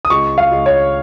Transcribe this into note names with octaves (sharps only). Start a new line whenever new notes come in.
D#6
C#2 C#6
F5
C#2
C#5